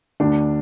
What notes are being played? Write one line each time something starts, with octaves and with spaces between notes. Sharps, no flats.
D2 D4